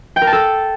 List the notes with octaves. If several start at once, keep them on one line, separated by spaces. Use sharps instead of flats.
G5
A#4
A5
A4